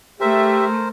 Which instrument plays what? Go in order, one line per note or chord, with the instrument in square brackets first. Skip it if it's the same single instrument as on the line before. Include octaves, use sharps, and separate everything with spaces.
[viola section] A3 [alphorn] G4 [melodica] A#4 C5 [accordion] E5